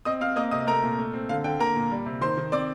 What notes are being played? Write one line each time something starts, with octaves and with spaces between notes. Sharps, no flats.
C4 D#5 D#6
C4 F5 F6
A#3 D#5 D#6
C3 D#5 D#6
A3 A#4 A#5
A#2
A3
C4
D3 F5
D3 G5
A#3 A#4 A#5
A#2
G3
C3
D#3 C5 C6
D#3
C4 D5 D6